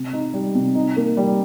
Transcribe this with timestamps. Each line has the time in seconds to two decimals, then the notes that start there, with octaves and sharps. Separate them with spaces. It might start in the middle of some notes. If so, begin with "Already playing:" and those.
Already playing: C3
0.13 D#4
0.34 G3
0.55 C3
0.75 D#4
0.96 A#3
1.17 G3